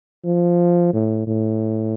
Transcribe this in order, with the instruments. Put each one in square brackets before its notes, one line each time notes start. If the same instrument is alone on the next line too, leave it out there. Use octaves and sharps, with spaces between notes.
[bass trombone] F3
A2
A2